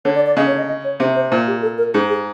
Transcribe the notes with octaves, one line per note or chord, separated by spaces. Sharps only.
D3 C#5
D5
D5
C#3 D#5
C#5
D#5
D#5
C#5
C3 C5
C5
A#2 C5
G4
A4
A#4
G#2 G#4
G#4